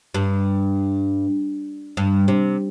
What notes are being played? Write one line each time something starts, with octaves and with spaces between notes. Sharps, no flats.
G2
G2
C3